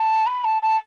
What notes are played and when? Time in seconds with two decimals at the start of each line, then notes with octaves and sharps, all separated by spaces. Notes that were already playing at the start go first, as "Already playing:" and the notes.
Already playing: A5
0.26 B5
0.44 A5
0.62 A5